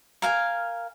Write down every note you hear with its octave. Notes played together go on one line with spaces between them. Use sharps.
A#4 F5 G#5